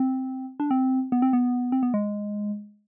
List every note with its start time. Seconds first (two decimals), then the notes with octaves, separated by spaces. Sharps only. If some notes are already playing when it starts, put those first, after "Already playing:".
Already playing: C4
0.60 D4
0.71 C4
1.12 B3
1.22 C4
1.33 B3
1.72 C4
1.83 B3
1.94 G#3